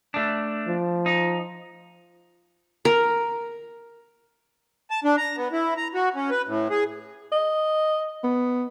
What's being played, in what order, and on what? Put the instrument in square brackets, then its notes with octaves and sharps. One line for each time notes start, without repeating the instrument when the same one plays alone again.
[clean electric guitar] A3 D4
[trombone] F3
[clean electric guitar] D#4
[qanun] A#4
[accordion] A5
D4
A#5
B3
E4
A#5
F#4
C#4
B4
A2
G#4
[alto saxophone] D#5
B3